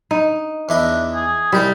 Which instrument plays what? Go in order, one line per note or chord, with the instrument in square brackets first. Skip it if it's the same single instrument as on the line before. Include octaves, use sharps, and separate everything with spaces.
[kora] D#4
[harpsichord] E2 E4 D#5 [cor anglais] D4
[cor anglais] G#4
[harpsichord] C2 A#4 [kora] G3 [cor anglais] D#4